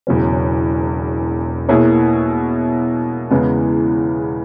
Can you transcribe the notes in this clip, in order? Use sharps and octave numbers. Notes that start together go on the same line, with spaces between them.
E1 E2 C#3 F#3 C#4
B2 A#3 E4 G#4 C#5
E2 C#3 E3 G#3 B3